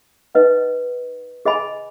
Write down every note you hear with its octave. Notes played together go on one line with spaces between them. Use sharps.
D#4 B4 D#5 F#5
G#4 D#5 G#5 B5